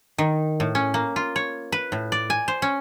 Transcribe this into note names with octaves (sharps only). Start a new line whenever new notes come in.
D#3
A2
C#4
A#3
F4
C#5
B4
A2
D5
G#5
C5
C#4